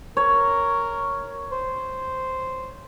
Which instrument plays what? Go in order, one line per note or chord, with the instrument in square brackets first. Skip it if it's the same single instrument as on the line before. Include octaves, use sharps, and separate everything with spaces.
[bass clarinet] A#4 [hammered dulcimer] C#5
[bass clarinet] C5